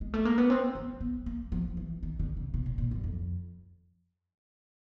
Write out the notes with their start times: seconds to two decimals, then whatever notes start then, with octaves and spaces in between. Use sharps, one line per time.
0.01 G#3
0.14 A3
0.25 A#3
0.38 B3
0.50 C4
0.75 B3
1.01 B3
1.26 A#3
1.52 F3
1.77 E3
2.03 D#3
2.19 D3
2.37 C#3
2.54 C3
2.66 A#2
2.78 A#2
2.91 F#2
3.04 F2